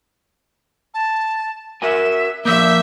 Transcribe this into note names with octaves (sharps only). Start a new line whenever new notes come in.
A5
F#4 A#4 E5 G#5
F3 A#3 E5 G6